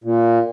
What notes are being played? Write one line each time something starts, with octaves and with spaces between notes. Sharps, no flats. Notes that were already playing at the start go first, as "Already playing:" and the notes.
A#2